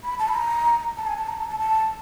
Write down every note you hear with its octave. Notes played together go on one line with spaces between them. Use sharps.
B5
A5
B5
A#5
A5
G#5
A5
A#5
A5
A5
A5